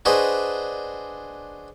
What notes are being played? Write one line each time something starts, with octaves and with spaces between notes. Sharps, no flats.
D4 F#4 G#4 B4 C5 D#5